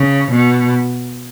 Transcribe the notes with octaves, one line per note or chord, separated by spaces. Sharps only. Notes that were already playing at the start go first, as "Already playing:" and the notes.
Already playing: C#3
B2